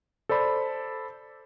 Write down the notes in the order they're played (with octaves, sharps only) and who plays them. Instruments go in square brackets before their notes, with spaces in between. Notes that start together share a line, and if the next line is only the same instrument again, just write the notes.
[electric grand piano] A4 C5 D5 B5